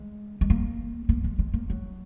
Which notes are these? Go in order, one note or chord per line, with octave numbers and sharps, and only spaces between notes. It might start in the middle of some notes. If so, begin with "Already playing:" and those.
Already playing: G#3
G#3
A#3
A#3
G#3
G#3
A#3
F#3